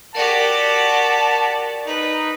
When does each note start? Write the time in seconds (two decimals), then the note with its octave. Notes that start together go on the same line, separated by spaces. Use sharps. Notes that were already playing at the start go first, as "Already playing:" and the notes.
0.15 F#4 G4 A#4 D5 A5
1.87 D#4 B4